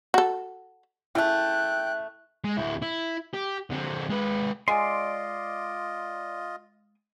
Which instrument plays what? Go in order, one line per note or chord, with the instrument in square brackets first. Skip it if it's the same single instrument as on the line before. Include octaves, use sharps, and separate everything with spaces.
[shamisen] F#4 A4
[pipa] C#3 A3 [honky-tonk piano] E4 [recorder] G5 [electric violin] F#6
[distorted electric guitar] G#3
D2 E4
E4
G4
D3 C4
G#3 B4
[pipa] G#3 [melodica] F4 D#5 [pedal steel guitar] D5 C6